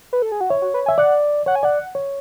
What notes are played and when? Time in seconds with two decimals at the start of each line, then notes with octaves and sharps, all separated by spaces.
0.13 B4
0.22 A4
0.32 G#4
0.41 F#4
0.50 E4 C#5
0.62 F#4
0.74 B4
0.86 E5 G#5
0.98 D5 F#5
1.46 C#5 F#5
1.55 G#5
1.63 D5 F#5
1.95 C#5